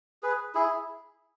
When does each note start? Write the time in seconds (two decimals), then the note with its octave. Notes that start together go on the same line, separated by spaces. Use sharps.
0.23 G#4 B4
0.55 E4 G#4